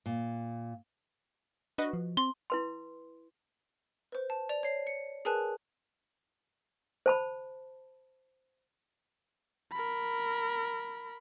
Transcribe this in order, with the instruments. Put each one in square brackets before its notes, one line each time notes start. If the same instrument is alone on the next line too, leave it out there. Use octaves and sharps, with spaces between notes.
[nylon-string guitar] A#2
[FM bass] D4 [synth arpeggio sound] F#4 B4 D#5
[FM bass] F3
[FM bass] C4 [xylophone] C6
[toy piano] E4 B4 C6
[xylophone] B4 C5
A5
D5 F7
C#5 C7
C#7
G#4 A#4 B4 G#5 A5 F#6
[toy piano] C5 A5 B5
[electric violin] A#4 B5